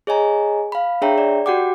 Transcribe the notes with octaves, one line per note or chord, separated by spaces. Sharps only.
G#4 C#5 D#5 G#5 A#5
F5 B5
D4 G#4 C#5 E5 G5 A#5
D5
F#4 G4 F#5 G5 D6